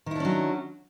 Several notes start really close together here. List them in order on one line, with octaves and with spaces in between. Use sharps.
D#3 E4 D4 C#4 F#3